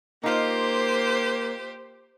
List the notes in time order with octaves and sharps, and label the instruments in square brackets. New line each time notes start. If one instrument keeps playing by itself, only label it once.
[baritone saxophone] A#3 [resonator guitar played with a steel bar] D#4 F4 [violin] G4 C5